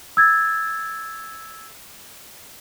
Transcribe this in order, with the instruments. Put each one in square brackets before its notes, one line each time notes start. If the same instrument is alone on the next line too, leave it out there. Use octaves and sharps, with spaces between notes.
[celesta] E6 G#6 A6